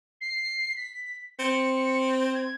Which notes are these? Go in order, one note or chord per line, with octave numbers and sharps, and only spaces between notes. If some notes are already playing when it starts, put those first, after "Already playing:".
C7
B6
C4 C#7
G#6